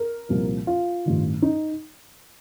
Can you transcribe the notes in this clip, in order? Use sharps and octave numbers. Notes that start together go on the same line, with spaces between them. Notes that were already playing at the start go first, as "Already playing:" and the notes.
Already playing: A#4
C2 A#2 F3
F4
A1 G2 D#3
D#4